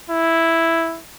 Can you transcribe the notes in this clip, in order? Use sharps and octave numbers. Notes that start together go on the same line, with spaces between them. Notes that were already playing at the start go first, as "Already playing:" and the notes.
E4